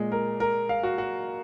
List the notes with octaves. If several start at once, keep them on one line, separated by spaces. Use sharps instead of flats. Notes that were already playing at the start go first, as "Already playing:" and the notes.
Already playing: A#2 G#3
A#4
A#4
F5
F#4
F#4